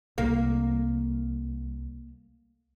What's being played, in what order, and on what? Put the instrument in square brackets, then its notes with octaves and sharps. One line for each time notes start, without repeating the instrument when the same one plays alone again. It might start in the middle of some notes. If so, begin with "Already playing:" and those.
[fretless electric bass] C2 [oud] A#3